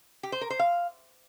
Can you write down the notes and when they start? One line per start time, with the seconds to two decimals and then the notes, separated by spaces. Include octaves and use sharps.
0.23 G4
0.32 C5
0.41 A#4
0.50 C5
0.59 F5